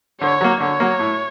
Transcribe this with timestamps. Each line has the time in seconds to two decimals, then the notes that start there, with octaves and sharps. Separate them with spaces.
0.21 D3 C#5
0.41 F#3 A#3
0.60 D3 C#5
0.80 F#3 A#3
0.99 A2